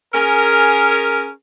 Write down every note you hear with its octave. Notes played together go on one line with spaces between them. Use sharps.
C#4 G#4 A#4